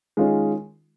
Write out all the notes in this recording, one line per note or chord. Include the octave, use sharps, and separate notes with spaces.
D#3 G#3 C#4 F4 G#4